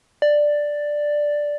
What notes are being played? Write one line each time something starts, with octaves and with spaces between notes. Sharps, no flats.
D5